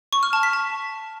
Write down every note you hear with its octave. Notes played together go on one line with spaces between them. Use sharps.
C#6
F6
A5
B6
A5